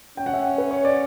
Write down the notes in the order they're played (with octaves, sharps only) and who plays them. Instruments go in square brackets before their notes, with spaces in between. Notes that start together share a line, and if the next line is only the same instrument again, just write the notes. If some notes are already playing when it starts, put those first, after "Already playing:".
[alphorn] C#4 [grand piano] G5
[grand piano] F#5
E5
F#5
B4
C#5
D5